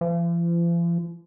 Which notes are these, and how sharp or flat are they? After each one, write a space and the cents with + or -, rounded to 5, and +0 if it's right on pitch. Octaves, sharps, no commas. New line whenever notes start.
F3 -45